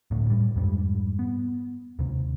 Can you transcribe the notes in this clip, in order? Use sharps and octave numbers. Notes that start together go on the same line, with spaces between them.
D2 A2
A2 G3
F2 G#2 G3
B3
D#2 C3